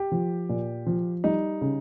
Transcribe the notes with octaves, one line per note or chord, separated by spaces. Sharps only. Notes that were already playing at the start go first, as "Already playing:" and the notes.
Already playing: G4
F3
A#2
F3
G3 D#4
C#3